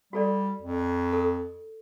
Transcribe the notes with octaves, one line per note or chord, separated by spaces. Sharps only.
G3 F#4 A4 D5
F2
A4